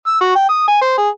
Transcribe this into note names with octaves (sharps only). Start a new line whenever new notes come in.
E6
F#4
G5
D#6
G#5
C5
G#4